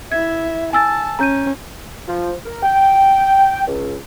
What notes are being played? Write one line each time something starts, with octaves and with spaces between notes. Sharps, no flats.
E4 E5 G#6
G#5 A5 E6 A6
C#4 A#5 G6 D#7
F3
A#4
G5
C#2